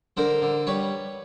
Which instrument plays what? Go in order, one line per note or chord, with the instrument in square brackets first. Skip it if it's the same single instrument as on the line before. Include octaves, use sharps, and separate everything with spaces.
[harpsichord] D3 A#4 C5
D3
G3 B4 C#5